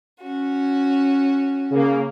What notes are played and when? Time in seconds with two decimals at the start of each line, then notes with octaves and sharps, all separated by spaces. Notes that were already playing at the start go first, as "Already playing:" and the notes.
0.21 C#4 F#4
1.70 C#3 A#3